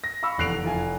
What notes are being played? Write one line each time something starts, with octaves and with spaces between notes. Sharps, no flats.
A#6
F5 B5 C#6 E6
F1 E2 F#6 C7 D7 F7
F1 E4 F4 G#5